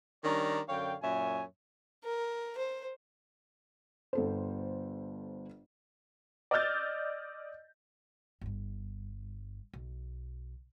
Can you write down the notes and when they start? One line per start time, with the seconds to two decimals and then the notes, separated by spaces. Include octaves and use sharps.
0.24 D#3 G3 C#4 D4 D5 A#5
0.68 F#2 D3 C#5 F5 G5
1.02 F#2 A#2 C#5 E5 G#5
2.04 A#4
2.58 C5
4.13 G1 A4 C5
6.51 D5 D#5 E6 F6 G6 A6
8.41 G1 G2
9.74 B1